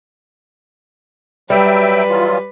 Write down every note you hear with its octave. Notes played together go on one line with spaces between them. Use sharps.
F#3 G3 B4 E5 G5
E3 F#3 F4